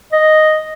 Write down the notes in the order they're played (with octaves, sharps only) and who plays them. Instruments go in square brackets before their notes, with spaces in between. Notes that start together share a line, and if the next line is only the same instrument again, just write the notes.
[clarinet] D#5